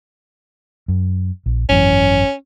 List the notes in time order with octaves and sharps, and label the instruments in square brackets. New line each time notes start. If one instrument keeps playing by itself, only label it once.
[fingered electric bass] F#2
A#1
[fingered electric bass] G#1 F#2 E3 [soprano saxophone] C#4